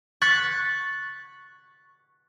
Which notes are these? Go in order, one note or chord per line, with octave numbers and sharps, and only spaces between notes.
C#6 F#6 G#6 A6 B6